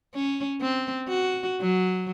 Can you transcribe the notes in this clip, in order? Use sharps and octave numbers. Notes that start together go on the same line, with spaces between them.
C#4
C4
F#4
F#3